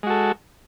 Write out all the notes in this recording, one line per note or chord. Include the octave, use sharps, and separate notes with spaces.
G#3 F#4 A4